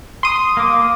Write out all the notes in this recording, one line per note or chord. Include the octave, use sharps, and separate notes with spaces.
C6 D#6
A#3 D6